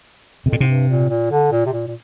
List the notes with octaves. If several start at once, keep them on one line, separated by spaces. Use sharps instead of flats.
F2 C3
A#2
G#2 C3
G2
A#2
A#2
D3
A#2
C3
A#2
A#2